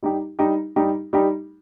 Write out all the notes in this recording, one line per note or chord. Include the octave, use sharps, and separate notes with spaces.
G3 D#4 G4
G3 D#4 G4
G3 D#4 G4
G3 D#4 G4